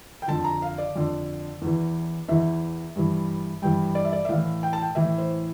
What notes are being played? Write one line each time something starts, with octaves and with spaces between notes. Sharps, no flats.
G5
F2 D3 A5
A#5
F5
D5
F2 D3
E2 E3
E2 E3 E5
G2 E3
G2 E3 G5
D5
E5
D5
E5
A2 E3 F5
G5
A5
G5
A2 E3 E5
C5